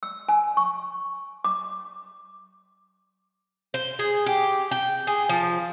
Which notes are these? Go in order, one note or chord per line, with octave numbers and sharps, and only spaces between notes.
E6
G#5
C#6
D6
C5
G#4
G4
G5
G#4
F3